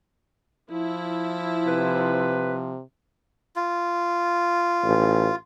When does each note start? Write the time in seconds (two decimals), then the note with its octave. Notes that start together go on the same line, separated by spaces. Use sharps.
0.72 F3 E4
1.67 C3 B4
3.56 F4
4.83 A1